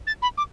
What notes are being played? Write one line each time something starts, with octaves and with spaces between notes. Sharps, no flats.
A6
B5
D6